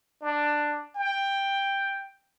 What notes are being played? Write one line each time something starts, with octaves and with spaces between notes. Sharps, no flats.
D4
G5